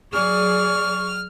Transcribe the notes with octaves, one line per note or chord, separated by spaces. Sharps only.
F#3 G#4 D5 C#6 F6